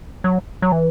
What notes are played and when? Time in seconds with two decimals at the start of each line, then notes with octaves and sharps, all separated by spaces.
0.24 F#3
0.62 F#3
0.72 E3